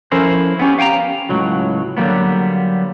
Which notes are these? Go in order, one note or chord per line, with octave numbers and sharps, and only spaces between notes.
F3 C#4 E4 A4 A#4 C5
B3 C#4 G4
F5 G5 G#5 A#5
C#2 A2 F#3
D3 F#3 G3 A#3 B3